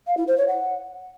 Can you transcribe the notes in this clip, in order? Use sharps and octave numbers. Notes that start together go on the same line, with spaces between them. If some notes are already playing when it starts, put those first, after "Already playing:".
F5
E4
C5
C#5
F#5